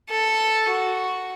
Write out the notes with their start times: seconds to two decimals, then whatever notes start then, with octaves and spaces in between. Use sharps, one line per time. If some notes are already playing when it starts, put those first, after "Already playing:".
0.09 A4
0.69 F#4